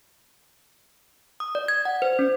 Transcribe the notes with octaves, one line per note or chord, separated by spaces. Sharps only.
D#6
D5
G#6
F#5
C5
C#4